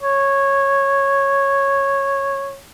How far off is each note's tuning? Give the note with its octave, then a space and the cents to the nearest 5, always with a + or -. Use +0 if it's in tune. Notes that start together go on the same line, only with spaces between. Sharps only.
C#5 -10